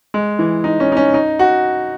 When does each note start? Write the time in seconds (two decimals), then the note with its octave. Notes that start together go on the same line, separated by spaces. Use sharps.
0.14 G#3
0.39 E3
0.64 D#4
0.80 C#4
0.92 D#4
0.97 C#4
1.14 D#4
1.39 F#4